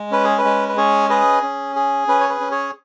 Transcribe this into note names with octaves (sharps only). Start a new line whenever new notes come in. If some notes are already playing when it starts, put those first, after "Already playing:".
Already playing: G#3
C#4 B4
G#4
B4
G#3
B4
C#4 G#4 C#5
G#4 B4 D#5
C#4
G#4
C#4 B4
C#5
B4
C#4
G#4 C#5